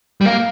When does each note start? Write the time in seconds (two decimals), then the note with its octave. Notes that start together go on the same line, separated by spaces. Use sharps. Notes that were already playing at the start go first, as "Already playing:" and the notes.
0.21 G3
0.25 A#3 F5